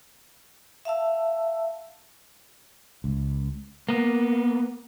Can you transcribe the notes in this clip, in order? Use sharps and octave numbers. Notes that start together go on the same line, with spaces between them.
E5 F5 A5 E6
C#2
A#3 B3